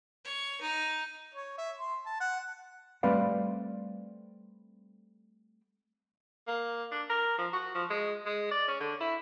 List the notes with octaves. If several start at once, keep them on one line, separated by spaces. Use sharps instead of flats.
C#5
D#4
C#5
E5
C6
A5
F#5
G3 A3 C4 B4 D5 F5
A#3
D4
A#4
F3
F#4
F3
G#3
G#3
D5
C#4
D3
E4